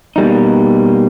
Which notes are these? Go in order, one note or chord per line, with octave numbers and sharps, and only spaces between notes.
B2 G3 A#3 D#4